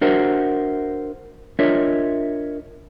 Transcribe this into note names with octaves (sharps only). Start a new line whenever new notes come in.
D4 F#4 A#4 C5 E5 F#5
D4 F4 A#4 C#5 D#5 E5